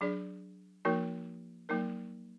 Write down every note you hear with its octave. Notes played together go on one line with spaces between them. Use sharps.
F#3 D4 G#4 D5
F3 A#3 D#4 F#4 A#4
F#3 A#3 D#4 A#4